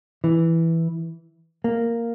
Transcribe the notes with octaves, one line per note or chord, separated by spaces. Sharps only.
E3
A#3